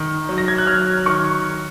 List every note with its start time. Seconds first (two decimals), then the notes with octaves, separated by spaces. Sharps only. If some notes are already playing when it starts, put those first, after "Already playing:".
Already playing: D#3
0.29 F#3
0.38 A#6
0.48 G#6
0.58 F#6
0.67 F#3 F6
1.06 D#3 C#6